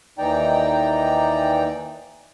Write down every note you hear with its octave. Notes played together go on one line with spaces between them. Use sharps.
D#2 E3 D#4 D5 G5 A#5